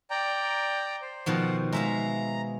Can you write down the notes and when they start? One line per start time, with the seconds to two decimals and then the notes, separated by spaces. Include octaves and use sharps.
0.10 D5 G5 A#5
1.02 C5
1.26 B2 D#3 F3 C5 F#5
1.73 G#3 E5 F5 A#5